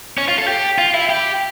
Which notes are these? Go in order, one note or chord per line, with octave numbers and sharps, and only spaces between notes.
C#4
F4
A4
G4
F4
E4
G4